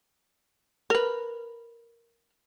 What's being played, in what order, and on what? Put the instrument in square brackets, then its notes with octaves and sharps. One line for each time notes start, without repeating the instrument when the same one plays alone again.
[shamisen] A#4 B4